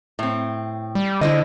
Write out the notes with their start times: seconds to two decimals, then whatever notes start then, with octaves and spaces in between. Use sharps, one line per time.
0.19 A2 C4
0.95 G3
1.21 D3 E4 C5 D#5